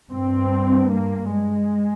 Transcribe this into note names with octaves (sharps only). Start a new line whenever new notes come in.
G2 C4
A#3
G#3